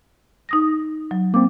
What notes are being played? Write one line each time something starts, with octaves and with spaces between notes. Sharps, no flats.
D#4 D#6 A#6
F#3
A#3 C4 D6